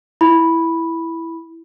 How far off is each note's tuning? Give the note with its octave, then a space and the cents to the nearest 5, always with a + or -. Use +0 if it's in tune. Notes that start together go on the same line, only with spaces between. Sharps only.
E4 +0 B5 -5